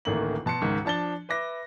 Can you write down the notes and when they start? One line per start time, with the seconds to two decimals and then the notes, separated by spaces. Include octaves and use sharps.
0.05 D1 A1 D#3 A3 A#3 F#7
0.46 B2 A5 C6 C#7
0.62 C#2 G#2 D#3
0.85 F3 D4 A5 A6 G7
1.29 B4 E5 D6 A#6